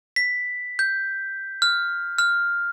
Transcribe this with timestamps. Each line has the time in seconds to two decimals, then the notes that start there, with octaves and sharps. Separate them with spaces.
0.16 B6
0.79 G6
1.62 F6
2.18 F6